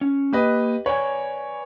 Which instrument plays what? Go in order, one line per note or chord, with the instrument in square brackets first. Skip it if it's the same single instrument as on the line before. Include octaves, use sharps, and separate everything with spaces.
[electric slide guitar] C#4
[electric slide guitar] A#3 [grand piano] G4 B4 D#5
[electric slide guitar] B4 D5 G#5 [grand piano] C#5